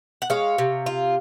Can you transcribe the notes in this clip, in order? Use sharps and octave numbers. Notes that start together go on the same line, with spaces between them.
F#5
G#3 C#5 F5
C3
F4